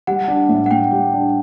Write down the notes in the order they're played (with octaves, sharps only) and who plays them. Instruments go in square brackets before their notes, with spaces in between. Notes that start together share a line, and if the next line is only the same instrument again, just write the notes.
[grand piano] G3 [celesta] F#5
[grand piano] D4
A2
[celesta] F#5
[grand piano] A2 [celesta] G5
[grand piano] G3
D4